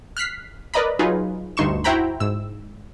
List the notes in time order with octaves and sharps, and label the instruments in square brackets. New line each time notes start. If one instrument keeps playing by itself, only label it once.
[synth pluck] F6 F#6 B6 C7
A#4 B4 D5 D#5 A#5 B5
F#3 D#4 F4 G#4 B4
D2 G2 D#4 C6 C#6 E7
E4 F#4 C5 G5 A#5 B5
G#2 E6